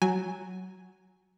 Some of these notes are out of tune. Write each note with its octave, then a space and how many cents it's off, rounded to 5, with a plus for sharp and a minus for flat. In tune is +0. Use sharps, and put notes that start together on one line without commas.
F#3 +5 G#5 +0